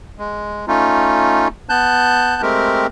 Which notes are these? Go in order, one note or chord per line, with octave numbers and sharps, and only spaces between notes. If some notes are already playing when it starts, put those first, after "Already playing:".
G#3
A3 C#4 D#4 F4
B3 A5 F#6 G6
G#3 A3 C4 G4 A#4